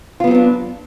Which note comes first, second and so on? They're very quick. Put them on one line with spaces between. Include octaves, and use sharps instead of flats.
F4 B3 F#3 C4 D4